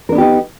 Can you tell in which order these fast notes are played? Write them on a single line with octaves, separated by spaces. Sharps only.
A#4 D4 B3 G4 D#4